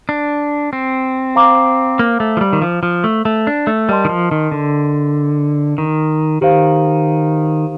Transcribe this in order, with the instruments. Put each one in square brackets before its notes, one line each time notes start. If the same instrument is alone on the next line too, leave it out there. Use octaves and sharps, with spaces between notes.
[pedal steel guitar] D4
C4
[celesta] C5 F5 A#5 D6
[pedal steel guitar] A#3
A3
F3
G3
D#3
F3
F3
A3
A3
D4
A3
[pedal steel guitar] G3 [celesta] A#4 D#5 A5 C6
[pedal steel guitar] D#3
F3
D#3
D3
D#3
[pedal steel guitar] D#3 [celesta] G4 C5 F5